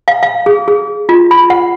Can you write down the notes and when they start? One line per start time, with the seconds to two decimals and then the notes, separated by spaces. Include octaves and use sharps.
0.08 F5
0.23 F5
0.46 G#4
0.68 G#4
1.09 F4
1.31 B5
1.50 F#5